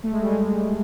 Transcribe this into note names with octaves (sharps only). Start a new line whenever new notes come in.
A3
G#3
G3
G#3